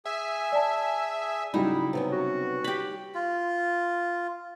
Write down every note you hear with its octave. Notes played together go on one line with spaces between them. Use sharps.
G#4 E5 G#5
D5 A5
C#3 F#3 G3 D#4 E4
C3 B3 C#4
F#4
G4 B5
F4